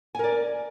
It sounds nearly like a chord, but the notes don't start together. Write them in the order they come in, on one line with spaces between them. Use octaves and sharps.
G#5 A#4 D5